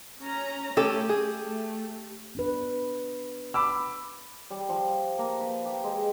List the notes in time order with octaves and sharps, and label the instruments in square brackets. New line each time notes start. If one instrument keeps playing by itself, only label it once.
[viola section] C#4 A#5
[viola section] A3 [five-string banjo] C#4 A4 [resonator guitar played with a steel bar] G4
[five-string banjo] G#4
[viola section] A3
[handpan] B3 D4 B4
[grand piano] B5 D6 E6
[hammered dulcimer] G3
F3
A#3
B4
G4
G#3